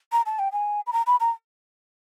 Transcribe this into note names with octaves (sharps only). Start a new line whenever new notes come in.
A#5
A5
G5
G#5
B5
A#5
B5
A#5